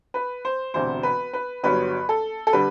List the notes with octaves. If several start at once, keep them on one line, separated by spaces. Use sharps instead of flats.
B4
C5
E1 D2 C3 E3 C5
B4
B4
G1 G2 F#3 B4
A4
A4
D3 G3 B4